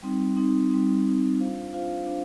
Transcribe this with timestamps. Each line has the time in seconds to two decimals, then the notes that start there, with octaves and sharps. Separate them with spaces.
0.02 G3 C4 D#4
0.37 G3 C4 D#4
0.70 G3 C4 D#4
1.05 G3 C4 D#4
1.39 D4 F4 C5 F5
1.73 D4 F4 C5 F5
2.06 D4 F4 C5 F5